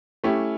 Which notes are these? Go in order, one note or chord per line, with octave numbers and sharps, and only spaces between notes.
A3 C#4 E4 G4